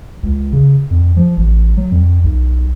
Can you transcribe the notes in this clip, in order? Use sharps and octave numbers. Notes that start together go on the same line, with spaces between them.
C#2
C#3
F2
F3
A1
F#3
F2
B1